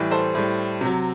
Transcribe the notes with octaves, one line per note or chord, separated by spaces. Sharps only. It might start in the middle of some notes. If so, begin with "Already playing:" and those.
Already playing: A2 E3 G3
A4 C5
A2 G3
C3 F#3